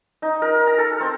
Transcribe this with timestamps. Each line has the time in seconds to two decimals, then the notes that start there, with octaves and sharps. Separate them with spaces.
0.22 D#4
0.42 A#4
0.67 A#5
0.78 A4
1.00 C4